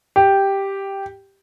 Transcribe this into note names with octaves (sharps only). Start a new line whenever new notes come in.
G4